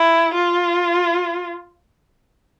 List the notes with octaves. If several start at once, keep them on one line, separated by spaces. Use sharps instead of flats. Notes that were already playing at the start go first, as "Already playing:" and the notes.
Already playing: E4
F4